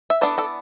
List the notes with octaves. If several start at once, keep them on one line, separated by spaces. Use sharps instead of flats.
E5
E3 B3 D4 A4 D5
A4 D5